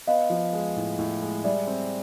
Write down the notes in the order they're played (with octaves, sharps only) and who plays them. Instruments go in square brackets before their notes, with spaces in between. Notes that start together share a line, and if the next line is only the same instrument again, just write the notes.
[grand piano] B3 [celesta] D#5 F5
[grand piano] F3
G#3
A2
A2
G#3
[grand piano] G3 [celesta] D5 E5
[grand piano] C4